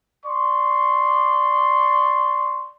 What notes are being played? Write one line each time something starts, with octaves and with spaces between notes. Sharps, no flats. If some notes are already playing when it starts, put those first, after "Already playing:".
D5 C6 C#6